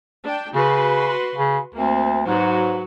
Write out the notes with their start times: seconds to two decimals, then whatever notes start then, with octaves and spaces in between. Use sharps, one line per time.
0.24 D4 G5
0.55 C#3 F#4 B4 C6
1.35 C#3
1.75 D2 A#3 C4
2.27 G#2 F#3 F#4 B4